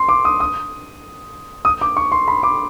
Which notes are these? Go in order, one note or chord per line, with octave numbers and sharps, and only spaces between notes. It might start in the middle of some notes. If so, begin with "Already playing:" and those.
Already playing: C6
D6
D#6
D#6
D#6
D6
C#6
C6
B5
D6